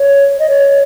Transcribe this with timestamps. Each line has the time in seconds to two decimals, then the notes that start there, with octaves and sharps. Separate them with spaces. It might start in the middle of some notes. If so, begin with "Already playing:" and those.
Already playing: C#5
0.39 D#5
0.50 C#5